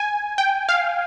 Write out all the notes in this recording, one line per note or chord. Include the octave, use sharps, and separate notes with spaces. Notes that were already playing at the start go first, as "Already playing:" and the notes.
Already playing: G#5
G5
F5